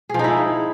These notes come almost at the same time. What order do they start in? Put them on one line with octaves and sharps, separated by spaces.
G#4 F3 D#4 E4